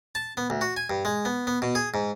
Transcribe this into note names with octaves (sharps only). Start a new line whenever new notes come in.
A5
B3
D2
F#4
G#5
G2
G#3
B3
B3
B2
G#4
G#2